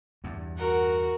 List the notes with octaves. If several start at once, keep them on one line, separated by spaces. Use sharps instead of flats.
E2 G2
F#4 A#4 F#5